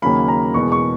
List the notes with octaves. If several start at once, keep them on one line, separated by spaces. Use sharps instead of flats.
D#2 C#3 F#3 A#3 B5
A#5
E2 B2 G#3 B3 C#6
C#6